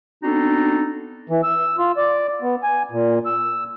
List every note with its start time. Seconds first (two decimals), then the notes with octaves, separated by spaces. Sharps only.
0.23 B3 C4 D4 D#4 F#4 A4
1.30 E3
1.43 E6
1.78 F4
1.97 D5
2.42 B3
2.63 G#5
2.91 A#2
3.26 E6